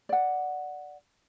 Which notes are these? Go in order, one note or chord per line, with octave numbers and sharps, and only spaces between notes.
D5 F#5